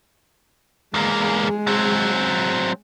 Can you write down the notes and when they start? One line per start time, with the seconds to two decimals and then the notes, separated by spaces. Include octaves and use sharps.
0.94 E2 G#3 A#3 G#4
1.67 F#3 C4